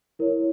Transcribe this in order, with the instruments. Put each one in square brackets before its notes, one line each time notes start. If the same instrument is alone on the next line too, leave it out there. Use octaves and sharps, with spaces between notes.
[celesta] E4 A#4 C#5